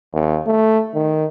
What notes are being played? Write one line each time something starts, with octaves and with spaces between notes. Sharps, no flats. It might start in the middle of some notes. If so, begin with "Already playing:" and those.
D#2
A3
D#3